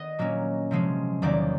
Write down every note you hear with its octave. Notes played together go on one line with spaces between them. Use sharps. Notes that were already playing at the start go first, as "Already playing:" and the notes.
Already playing: D#3 B3 D#5
A#2 F#3 A#3 C#4
C3 F3 G#3 C#4
E2 C3 D#3 F#3 A#3 D5